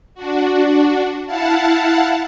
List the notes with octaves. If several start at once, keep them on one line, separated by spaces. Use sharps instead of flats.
D4 F#4
E4 F5 F#5 A5